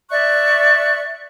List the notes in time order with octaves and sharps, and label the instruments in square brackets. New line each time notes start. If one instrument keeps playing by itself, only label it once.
[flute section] D5 E5 C#6 F#6